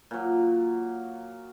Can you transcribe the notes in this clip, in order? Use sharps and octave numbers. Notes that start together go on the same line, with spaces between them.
A#2 F#3